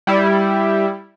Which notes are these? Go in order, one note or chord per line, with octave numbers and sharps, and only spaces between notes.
G3 E4